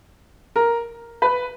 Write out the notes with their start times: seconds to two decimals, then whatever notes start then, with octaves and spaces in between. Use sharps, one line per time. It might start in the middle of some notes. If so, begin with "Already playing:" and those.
0.56 A#4
1.22 B4